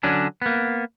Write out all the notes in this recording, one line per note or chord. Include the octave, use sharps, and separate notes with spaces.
D3 F#3 C#4 D4
A#3 B3